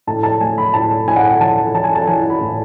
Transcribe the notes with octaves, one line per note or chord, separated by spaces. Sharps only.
A2 A5
A5
A3 G#5
B5
A2 A5
A2 G#5
F#5
G#5
E3 A5
E3 A5
G#5
A5
E3 G#5
B5
A2